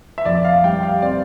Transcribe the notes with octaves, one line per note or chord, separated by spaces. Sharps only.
E5
F2 D5
F5
G3 G5
F5
C4 D5